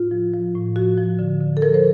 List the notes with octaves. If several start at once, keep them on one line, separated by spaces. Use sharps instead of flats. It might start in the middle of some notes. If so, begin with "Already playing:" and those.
Already playing: A2 F4
F3
F3
A2
F3 F#4
F3
D3
D3
A4
F3 A#4
C5